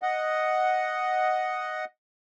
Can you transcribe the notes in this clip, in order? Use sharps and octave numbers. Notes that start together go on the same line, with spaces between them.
D#5 F#5